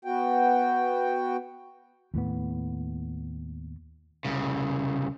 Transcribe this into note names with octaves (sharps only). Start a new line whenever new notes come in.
B3 F#4 G5
D#2 A2 B3
C2 C#3